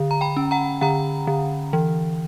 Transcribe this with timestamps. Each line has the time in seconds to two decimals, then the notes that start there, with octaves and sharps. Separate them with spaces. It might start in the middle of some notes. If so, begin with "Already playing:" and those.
Already playing: D3
0.11 A#5
0.21 G5 B5
0.37 C#4
0.51 F#5 A#5
0.81 D3 F#5 A#5
1.27 D3
1.73 E3